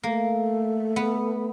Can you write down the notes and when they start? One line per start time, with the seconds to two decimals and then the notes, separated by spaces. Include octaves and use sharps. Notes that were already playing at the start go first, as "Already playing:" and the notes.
0.03 A3 A#3
0.96 B3